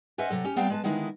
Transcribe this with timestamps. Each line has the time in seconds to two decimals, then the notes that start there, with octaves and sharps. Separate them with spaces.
0.18 C#4 B4 C5 D#5 E5 F#5
0.30 C3 F#3 A4
0.44 C#4 G4
0.56 G3 B3 C4 F5 G5 A5
0.70 G#3 B4 A5
0.84 D3 D#3 G#3 D#4 E4